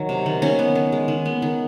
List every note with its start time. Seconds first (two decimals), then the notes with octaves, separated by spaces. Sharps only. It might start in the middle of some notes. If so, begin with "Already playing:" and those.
Already playing: D#3 F#3
0.09 C3
0.26 D#3
0.42 D#3 C#4
0.59 B3
0.75 D#3
0.92 G#3
1.08 D#3
1.25 B3
1.42 D#3